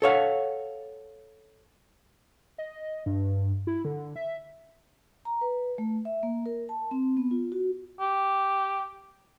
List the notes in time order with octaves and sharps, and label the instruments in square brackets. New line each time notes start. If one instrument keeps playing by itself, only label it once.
[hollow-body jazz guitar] A4 C#5 F5 F#5
[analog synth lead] D#5
G2
E4
D3
E5
[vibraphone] A#5
B4
A3
E5
A#3
A#4
A5
C4
B3
F4
F#4
[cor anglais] G4